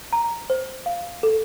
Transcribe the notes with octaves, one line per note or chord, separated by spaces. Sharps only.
A#5
C5
F5
A4